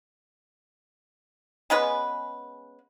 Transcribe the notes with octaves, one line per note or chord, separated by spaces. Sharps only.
C#3 G#3 B3 B4